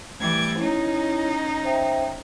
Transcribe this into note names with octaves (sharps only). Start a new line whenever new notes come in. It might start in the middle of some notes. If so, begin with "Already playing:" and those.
E3 G3 A3 G#6
C#4 D#4 E4 C#5
C5 E5 G5